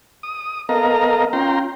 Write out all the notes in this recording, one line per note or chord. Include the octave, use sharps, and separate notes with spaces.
D#6
B3 A4 A#4 D#5 F5 A#5
C#4 F4 G5 A#5 C6